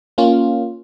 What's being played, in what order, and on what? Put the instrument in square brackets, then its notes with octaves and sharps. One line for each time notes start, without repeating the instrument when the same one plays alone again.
[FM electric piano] A#3 C#4 F4